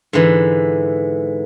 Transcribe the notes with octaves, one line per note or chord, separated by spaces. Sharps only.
G#2 D3 E3